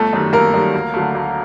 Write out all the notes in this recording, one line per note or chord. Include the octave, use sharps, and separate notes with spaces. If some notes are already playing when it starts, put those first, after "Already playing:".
Already playing: G1 A3 A4
F#2 D#3 G3
G1 A#3 A#4
F#2 D#3 G3
D2
D3 F#3 A3
D2